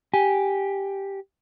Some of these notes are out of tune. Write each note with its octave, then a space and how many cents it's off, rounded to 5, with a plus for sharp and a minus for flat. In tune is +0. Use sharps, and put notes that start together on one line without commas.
G4 +0 G#5 +0